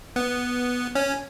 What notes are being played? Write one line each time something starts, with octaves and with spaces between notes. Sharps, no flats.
B3
C#4